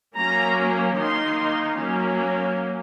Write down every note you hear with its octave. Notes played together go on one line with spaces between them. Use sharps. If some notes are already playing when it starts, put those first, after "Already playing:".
F#3 A#3 C#4 A#5
D#3 A#3 D#4 C6
F#3 A#3 C#4